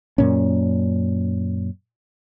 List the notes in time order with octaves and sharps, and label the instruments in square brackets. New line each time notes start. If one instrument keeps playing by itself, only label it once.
[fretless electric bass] F#2 A#2 C#4